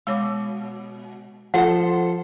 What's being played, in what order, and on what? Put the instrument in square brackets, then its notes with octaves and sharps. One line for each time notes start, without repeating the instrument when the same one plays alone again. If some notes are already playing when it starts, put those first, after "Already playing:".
[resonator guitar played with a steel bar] B2 [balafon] G#3 C#5 D6
[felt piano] F3 [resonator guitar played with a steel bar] A4 C5 [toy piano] F#5